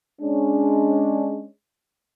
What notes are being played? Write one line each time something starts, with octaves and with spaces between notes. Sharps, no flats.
G#3 C#4 D4